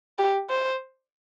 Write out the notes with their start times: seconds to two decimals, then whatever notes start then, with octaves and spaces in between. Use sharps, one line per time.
0.19 G4
0.50 C5